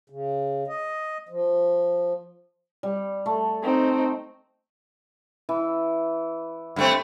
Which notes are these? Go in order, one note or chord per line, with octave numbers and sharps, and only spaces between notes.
C#3
D#5
F3
G3
A3
C4 D#4
E3
G2 A3 C4